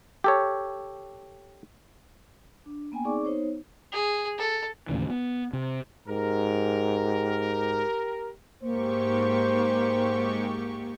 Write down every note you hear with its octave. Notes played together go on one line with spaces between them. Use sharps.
G4 A4 C#5
D4
A#3 B3 G5 G#5
C4 D#4 G#4 D5 C#6 D6
B3 D#4 C5 C#5
G#4
A4
D#2 A2 C#3 E3
B3
C3
G#2 G4 A#4
G#2 A#3 G4 C5 C#6